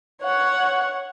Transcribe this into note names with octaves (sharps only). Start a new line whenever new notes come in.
C#5 F#5